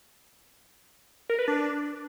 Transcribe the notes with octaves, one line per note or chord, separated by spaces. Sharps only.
A#4
B4
D4